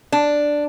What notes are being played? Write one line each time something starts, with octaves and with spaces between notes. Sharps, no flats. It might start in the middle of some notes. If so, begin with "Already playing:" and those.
D4